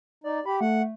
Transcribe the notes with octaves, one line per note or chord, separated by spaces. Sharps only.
D#4 D5
G4 B5
A3 F#5